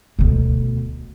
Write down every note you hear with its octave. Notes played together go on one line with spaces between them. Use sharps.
D2 B2